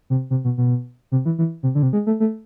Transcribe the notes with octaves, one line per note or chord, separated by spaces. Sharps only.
C3
C3
B2
B2
C3
E3
E3
C3
D3
C3
G#3
A3
A3